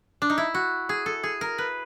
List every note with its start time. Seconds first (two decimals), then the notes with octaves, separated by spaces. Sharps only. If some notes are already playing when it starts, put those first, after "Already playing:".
0.22 D4
0.30 D#4
0.38 E4
0.54 F#4
0.89 G#4
1.06 A4
1.23 G#4
1.41 A#4
1.58 B4